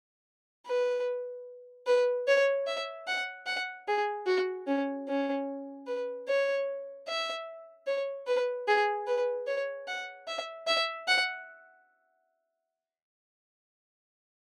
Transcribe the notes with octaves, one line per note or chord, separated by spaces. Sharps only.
B4
B4
C#5
E5
F#5
F#5
G#4
F#4
C#4
C#4
B4
C#5
E5
C#5
B4
G#4
B4
C#5
F#5
E5
E5
F#5